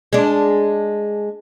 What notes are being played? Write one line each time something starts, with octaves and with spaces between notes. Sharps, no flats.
G#3 D4